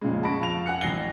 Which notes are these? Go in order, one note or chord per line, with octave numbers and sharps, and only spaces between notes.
F2 A#2 C#3 G#3
F#5 A5 B5 C#6 A#6 D7
F2 F5 A5 F7
F#5 G#5 F#6 C#7
A1 F#3 A#6 C7 G7